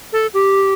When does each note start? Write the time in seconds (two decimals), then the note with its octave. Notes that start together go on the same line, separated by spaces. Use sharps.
0.12 A4
0.33 G4